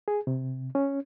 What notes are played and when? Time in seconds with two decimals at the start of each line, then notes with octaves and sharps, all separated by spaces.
0.08 G#4
0.27 C3
0.75 C#4